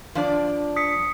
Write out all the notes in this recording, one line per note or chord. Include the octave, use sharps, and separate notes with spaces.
F3 D4 D5
D#6 B6 C#7